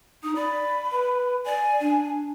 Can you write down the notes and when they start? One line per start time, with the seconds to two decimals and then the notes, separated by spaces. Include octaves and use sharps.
0.23 D#4 D#6
0.36 D5 B5
0.92 B4
1.45 D5 G#5
1.80 D4